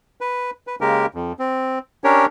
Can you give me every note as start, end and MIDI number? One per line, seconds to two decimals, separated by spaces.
0.21 0.51 71
0.67 0.76 71
0.81 1.06 49
0.81 1.06 56
0.81 1.06 58
0.81 1.06 67
0.81 1.06 70
1.14 1.33 41
1.39 1.79 60
2.04 2.26 61
2.04 2.26 62
2.04 2.26 67
2.04 2.26 70
2.04 2.26 73